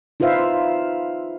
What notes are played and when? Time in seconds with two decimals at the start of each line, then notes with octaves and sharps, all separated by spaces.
0.20 D#4 F4 B4 C5 E5 F5